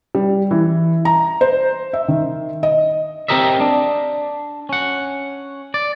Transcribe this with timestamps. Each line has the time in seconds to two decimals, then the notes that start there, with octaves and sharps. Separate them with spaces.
0.15 G3
0.51 E3
1.05 A#5
1.41 C5
1.93 E5
2.08 D#3
2.63 D#5
3.28 C4 C#4 G4 A#4 D#5 E5
3.61 D4
4.69 C#4 F#5
5.74 D5